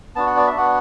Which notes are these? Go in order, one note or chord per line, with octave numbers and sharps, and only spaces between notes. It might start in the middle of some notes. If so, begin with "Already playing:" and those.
B3 D4 F#4 A5
F#5
D5
E5
B3 D4 F#4 F#5